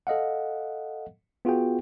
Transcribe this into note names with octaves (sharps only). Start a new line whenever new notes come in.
A4 D#5 F5 F#5
B3 F4 F#4 G#4 G5